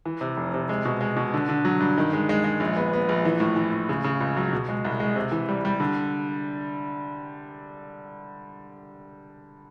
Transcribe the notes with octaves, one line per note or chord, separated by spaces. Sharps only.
E3
C3
F1
C3
G#3
B2
G#3
B2
D3
D3
F#3
G2
D#3
G#3
G#3
G#3
A#1
B3
B3
A#1
E3
A2
E3
A2
C#3
C#3
C#2
F#3
B2
G#3
C2
G#3
C3
E3
G3
G3
D3